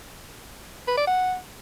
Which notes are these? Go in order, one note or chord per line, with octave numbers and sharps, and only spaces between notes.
B4
D5
F#5